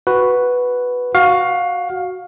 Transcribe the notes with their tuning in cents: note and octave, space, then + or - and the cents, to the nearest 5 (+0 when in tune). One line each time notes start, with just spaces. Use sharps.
F#4 +0 B4 +0
F#4 +0 F5 +20